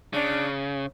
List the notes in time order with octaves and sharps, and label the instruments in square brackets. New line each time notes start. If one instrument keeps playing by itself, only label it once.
[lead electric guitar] C#3 [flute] D4